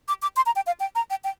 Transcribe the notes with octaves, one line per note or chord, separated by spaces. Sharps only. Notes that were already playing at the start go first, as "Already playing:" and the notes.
D6
D6
C6
A#5
G5
F5
G5
A#5
G5
G5